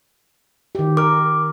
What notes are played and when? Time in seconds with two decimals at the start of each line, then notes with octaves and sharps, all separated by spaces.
0.75 D#3 G4
0.97 A#4 D6 F6